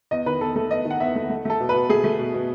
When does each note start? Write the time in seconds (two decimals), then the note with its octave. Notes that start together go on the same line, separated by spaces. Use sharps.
0.11 E2 D#5
0.26 D#3 B4
0.41 E2 A4
0.56 A3 A4
0.70 E2 D#5
0.85 D#3
0.90 F#5
1.00 E2 E5
1.15 A3
1.30 A3
1.45 A3 A4
1.60 B2
1.69 B4
1.74 B2
1.89 A3 G#4
2.04 A3
2.19 B2
2.34 B2